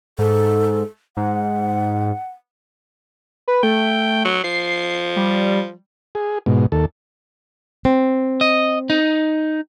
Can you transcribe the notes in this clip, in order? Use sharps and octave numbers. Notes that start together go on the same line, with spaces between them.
G#2 A4
G#2 F#5
B4
A3 G5
F#3
F3 C7
G3
G#4
G#2 B2
D#2 A4
C4
D#5
D#4